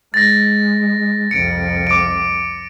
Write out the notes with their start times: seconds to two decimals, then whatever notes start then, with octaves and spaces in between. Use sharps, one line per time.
0.14 G#3 A6 A#6
1.31 C2 F2 C#7 D7
1.87 D6 D7